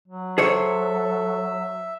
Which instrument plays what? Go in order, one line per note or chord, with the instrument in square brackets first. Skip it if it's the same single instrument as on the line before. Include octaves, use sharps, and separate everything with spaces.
[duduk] F#3
[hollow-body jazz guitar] G#4 C5 C#5 [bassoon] A4 [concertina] E5